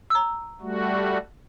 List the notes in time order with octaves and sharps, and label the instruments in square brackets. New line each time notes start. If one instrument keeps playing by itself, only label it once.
[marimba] A#5 E6
[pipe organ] G3 A3 F#4